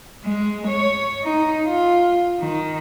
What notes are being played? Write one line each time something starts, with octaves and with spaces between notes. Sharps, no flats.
G#3
C#5
D#4
F4
D#3